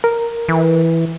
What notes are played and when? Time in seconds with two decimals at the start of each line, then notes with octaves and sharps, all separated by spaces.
0.04 A#4
0.49 E3